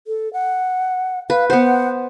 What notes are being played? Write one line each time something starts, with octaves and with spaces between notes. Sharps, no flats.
A4
F#5
B4 F5
B3 C5 F#5